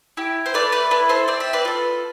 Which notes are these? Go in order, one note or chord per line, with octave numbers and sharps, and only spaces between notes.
E4 G4
C5
A3 B4 D5
B4 D5
E4 A4 B4
A4 C5
C4 D5
E5
B4 D5
F4 A4